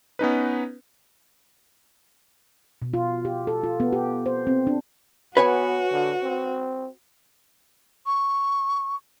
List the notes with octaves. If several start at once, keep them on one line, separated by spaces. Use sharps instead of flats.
B3 C#4 D#4 B4
B2
F4
G4
A4
F4
B3
G4
C5
C4
D4
B3 F#4 B4 C#5 G#5
D3
C4
C#6